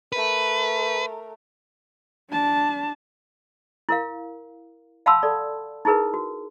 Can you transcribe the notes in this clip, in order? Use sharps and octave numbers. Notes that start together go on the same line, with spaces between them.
A3 A#4 B4
D4 A5
E4 A#4 F5
F5 F#5 A5 B5 C6 E6
A4 D5
D#4 E4 G#4 A#4 B4
F#4